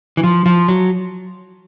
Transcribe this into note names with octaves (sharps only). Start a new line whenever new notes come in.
E3
F3
F3
F#3